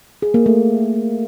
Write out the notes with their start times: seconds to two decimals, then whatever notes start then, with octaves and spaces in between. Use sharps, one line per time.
0.22 G#4
0.34 A#3
0.46 A3